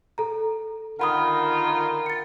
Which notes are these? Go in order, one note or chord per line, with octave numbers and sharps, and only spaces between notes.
A4 A#5
D3 D#3 F4 A#4 F#5 B5 D#6
A6 C#7